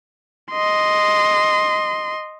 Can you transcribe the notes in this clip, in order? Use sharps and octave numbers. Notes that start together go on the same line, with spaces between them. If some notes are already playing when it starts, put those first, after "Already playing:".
D#5 C6